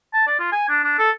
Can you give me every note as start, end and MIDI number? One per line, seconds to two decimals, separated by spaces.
0.14 0.26 81
0.28 0.37 74
0.39 0.52 65
0.53 0.68 80
0.69 0.80 62
0.84 0.96 62
0.99 1.11 69